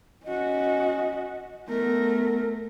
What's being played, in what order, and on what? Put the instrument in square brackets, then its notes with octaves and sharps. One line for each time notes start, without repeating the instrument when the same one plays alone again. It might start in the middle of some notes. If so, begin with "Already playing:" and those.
[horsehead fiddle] C#4 F#4 [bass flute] D#5
[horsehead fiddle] A3 A#4 [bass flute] B3